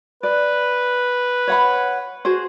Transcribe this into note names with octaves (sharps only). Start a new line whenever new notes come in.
B4 D5
C#5 F#5 B5
F#4 G#4 C5